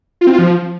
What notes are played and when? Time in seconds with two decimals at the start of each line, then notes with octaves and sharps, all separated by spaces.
0.21 F4
0.27 C4
0.33 F4
0.39 F3